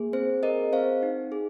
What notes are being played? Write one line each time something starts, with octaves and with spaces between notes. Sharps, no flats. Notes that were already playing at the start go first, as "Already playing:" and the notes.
Already playing: A#3 G#4
C4 C5
G#4 A#4 D#5
C4 C5 F5
D#4
G#4